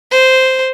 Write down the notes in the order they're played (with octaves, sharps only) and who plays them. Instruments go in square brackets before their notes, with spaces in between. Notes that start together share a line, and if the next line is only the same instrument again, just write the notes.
[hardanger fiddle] C5